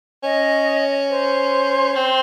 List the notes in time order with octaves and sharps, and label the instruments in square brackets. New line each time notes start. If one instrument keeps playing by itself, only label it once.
[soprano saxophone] C#4 [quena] D#5
[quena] C5
[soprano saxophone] C4